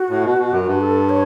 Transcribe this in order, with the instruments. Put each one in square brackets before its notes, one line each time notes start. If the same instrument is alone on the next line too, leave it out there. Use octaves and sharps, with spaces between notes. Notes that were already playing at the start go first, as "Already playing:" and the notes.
Already playing: [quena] F#4
[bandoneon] A2
B2
B2
F#2
G2
[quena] A4
C#5